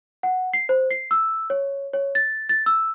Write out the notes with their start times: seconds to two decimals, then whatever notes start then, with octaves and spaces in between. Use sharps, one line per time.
0.23 F#5
0.53 C7
0.69 C5
0.91 C7
1.11 E6
1.50 C#5
1.94 C#5
2.15 A6
2.49 A6
2.66 E6